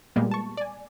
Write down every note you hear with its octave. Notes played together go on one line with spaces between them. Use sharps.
A#2 G3 G#3 A#3 B3
A5 C#6
D5 G#5